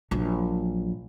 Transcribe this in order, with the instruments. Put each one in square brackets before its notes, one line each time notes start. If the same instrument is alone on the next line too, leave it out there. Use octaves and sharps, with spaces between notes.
[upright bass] A#1 F#3